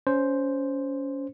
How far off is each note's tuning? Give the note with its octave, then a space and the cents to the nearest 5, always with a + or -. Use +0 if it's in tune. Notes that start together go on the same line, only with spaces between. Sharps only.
C#4 +20 C5 +0